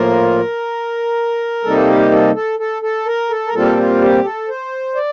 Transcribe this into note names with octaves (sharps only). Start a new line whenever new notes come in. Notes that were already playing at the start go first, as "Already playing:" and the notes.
Already playing: A2 F3 A#3 F4 A#4
C3 G3 A#3 D#4 A4
G4
A4
A4
A4
A4
A#4
A4
A#4
A#2 G3 C4 F4 A4
F4
G4
A4
C5
D5